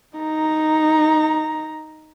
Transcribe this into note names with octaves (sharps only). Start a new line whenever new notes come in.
D#4 A#5